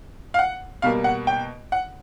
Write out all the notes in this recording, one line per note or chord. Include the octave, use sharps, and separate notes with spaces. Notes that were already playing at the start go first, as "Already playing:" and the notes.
F5
F#5
B2 G3 A#3 F5
F#5
G5
F#5